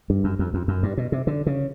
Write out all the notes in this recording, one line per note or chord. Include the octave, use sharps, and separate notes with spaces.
G2
F#2
F2
F2
F#2
G2
B2
C3
D3
C#3